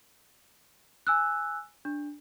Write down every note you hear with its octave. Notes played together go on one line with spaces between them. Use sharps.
G#5 E6 F#6
D4